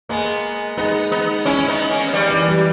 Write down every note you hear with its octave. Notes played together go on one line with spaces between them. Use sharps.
G#3 A#3 B3
G#3 B3 D#4
B3 D#4
C#4 E4
B3 D#4
A#3 C#4
B3
G3 A#3
E3
G3